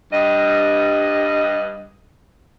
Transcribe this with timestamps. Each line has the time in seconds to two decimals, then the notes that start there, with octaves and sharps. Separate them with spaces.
0.13 G2 D#5